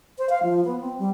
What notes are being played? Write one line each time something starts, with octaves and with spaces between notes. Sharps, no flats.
C5
F5
F3
B3
C4
G3